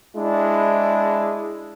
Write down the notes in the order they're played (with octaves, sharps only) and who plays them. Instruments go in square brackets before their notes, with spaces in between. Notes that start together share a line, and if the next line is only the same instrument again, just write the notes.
[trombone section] G#3 D4 E4